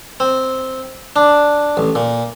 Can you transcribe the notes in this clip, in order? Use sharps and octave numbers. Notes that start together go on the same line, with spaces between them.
C4
D4
A1
A#2